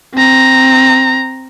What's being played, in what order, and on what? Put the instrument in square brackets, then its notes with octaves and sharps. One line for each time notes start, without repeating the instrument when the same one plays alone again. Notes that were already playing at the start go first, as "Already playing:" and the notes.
[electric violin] C4 A#5